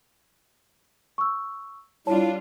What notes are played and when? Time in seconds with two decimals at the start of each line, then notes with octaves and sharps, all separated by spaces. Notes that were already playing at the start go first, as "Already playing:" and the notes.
1.18 C#6 E6
2.07 G3 D4 E4 F4 C#5 A5